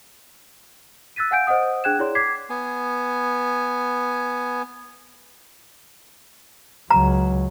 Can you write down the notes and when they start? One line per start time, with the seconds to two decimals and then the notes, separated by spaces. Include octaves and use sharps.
1.16 E6 F#6 A6 B6 D#7
1.31 F5 F#5 G#5 G6 D7
1.47 C5 D#5 F#5 D#6
1.84 D4 G#4 G5 F#6 G#6 E7
1.99 E4 G#4 C#5 D5 C6
2.15 D6 G#6 B6 C7
2.50 B3 G#5
6.90 C#2 F#3 A#5